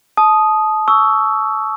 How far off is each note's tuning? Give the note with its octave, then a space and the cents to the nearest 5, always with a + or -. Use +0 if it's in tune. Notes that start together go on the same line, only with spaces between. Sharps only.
A5 -30 D#6 +0
C#6 +15 E6 +0